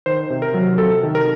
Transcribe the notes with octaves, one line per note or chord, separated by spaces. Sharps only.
D#3 C5
C3
A#4
F#3
C3 A4
D#3
A#4